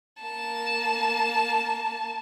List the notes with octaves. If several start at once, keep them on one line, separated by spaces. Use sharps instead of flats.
A#3 A5